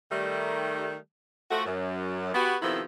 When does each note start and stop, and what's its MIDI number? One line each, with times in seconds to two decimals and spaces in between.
0.10 0.96 51
0.10 0.96 55
0.10 0.96 57
1.51 1.63 53
1.51 1.63 57
1.51 1.63 66
1.66 2.35 42
2.35 2.57 59
2.35 2.57 66
2.35 2.57 67
2.62 2.81 48
2.62 2.81 51
2.62 2.81 53
2.62 2.81 59
2.62 2.81 64
2.62 2.81 69